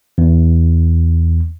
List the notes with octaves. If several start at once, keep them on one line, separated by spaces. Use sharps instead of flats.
E2